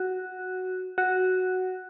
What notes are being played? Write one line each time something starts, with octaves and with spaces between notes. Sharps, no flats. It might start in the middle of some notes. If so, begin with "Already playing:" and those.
Already playing: F#4
F#4